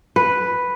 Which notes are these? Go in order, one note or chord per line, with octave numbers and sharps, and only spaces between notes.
B4